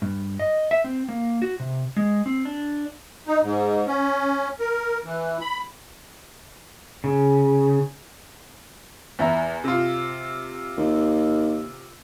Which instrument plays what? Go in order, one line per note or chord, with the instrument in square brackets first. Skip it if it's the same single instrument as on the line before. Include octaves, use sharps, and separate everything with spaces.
[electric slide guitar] G2
D#5
E5
C4
A#3
F#4
C3
G#3
C4
D4
[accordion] D#4
G#2
C#4
A#4
E3
B5
[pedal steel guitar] C#3
[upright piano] E2 E4 A#5
C3 F4
[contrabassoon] D#2